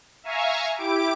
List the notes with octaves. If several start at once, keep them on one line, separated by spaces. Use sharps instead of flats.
E5 F5 G#5 A#5 C#6
E4 G4 D6 D7